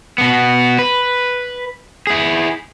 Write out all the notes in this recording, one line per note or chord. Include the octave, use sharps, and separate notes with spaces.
B2 B3
B4
E4 G#4